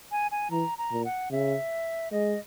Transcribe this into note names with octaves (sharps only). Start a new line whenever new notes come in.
G#5
G#5
E3 A#5
A#5
A#2
F#5
C#3 E5
G#3 D#5